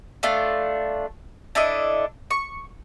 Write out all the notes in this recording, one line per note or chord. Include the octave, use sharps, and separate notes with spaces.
A3 D4 F4
D4 E4 A4 D#5
C#6